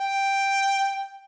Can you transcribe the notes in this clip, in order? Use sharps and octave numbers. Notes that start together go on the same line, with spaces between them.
G5